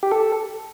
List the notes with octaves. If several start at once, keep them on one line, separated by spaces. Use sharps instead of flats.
G4
A4